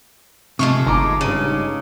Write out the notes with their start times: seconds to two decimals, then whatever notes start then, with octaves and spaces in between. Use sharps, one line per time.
0.59 C3 G#3 A3 F4 C#6
0.86 G1 D#4 A#5 D6
1.21 G2 C#3 D#7